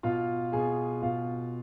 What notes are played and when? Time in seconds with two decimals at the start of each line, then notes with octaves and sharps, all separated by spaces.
0.03 B2 F4 F5
0.52 B2 G#4 G#5
1.02 B2 F4 F5